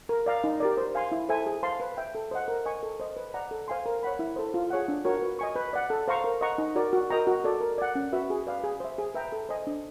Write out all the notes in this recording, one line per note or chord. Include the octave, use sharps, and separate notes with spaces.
A#4
D5 F5 A#5
D#4
G4 A#4 D5
C5
F5 G#5 C6
E4
A4 C5 E5 G#5
G#4
C5 F5 A5 C6
B4
E5 G5
A4
C5 D#5 F#5
A#4
D#5 G#5 C#6
A4
C5 D#5
B4
D5 F#5 A#5
A4
C5 F5 G#5 C6
A#4
C#5 F#5 B5
E4
A4 C5
F4
G#4 C#5 F#5
D4
F#4 A#4 C#5
B4
D#5 G#5 C#6
B4
D5 F#5
A4
C5 F5 A#5 C#6
A#4
D#5 F#5 A#5 C#6
D#4
F#4 A#4 D5
F#4
A#4 D#5 G5 A#5
F#4
A4 D5
A#4
D5 F#5
C#4
F#4 B4 E5
G#4
B4 D5 F5
G#4
C5 E5
G#4
B4 E5 G5 A#5
A4
C5 D#5 G#5
D4